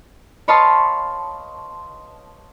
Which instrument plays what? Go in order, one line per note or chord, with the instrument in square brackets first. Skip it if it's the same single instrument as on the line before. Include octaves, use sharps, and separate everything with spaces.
[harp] B4 C#5 D#5 F5 A5 C6